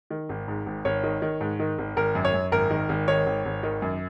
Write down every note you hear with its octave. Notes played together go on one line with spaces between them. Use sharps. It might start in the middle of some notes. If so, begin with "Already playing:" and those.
D#3
G#1
G#2
G#1
G#1 C#5
D#3
D#3
G#2
D#3
G#1
G#1 A#4
F#2
C#5
F#2
G#1 A#4
D#3
G#1
D#3 C#5
G#1
G#1
D#3
F#2